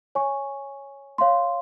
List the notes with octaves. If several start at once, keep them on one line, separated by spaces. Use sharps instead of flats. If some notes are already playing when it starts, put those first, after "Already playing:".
C#5 G#5 C#6
C#5 F5 C6